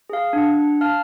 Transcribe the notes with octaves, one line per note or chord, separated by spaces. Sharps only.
G#4 F5
D4 F#5
F5 A5 F6